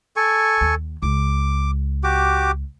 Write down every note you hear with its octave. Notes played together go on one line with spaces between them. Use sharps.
A4 G#5 C#6
D#2
C#2 D6
F#4 G4 D6